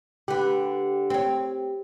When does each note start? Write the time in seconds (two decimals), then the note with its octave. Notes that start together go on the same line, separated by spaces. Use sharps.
0.28 D3 G4 B4
1.10 C4 C#5